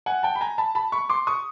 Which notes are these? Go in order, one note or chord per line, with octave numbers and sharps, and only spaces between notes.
F#5 G#5
G5 A5
B5
G#5 A#5
A5 B5
A5 B5
B5 C#6
C6 D6
C#6 D#6